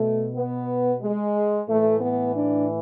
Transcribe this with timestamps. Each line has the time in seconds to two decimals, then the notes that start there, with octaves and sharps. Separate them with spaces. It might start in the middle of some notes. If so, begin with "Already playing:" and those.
Already playing: B2 A3
0.35 B3
1.01 G#3
1.68 A2 E3 A3
2.01 B3
2.35 D4